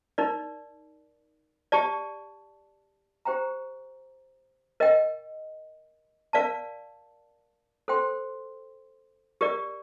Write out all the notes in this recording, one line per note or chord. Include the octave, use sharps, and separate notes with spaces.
D#4 A#4 D5
G4 D5 A5
G4 C5 G5 A#5
A#4 D#5 G5
A#4 D5 F5 A5
A4 C5 G5 C6
G4 A#4 D5